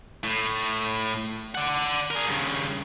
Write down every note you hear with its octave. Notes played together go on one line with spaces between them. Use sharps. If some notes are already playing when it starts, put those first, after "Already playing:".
A2
D5 F#5
G#4 A#4
G2 C#3